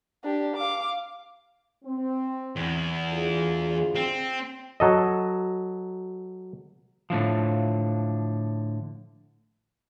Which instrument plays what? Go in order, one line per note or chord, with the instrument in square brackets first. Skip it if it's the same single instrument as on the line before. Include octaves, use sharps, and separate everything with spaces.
[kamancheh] D4 G4
F5 D6
[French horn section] C4
[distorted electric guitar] E2
[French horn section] D2 F4 G#4
[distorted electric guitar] C4
[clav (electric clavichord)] F#3 A4 D#5
[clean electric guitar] A2 D3 F3